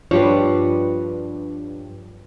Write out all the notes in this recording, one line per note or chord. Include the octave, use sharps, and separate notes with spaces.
G2 F3 G3 D4 B4 C#5